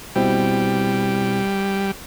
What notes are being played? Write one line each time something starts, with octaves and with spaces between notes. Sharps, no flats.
B2 G3 C4 E4